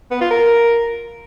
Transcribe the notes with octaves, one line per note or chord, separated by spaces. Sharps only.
B3
F4
A#4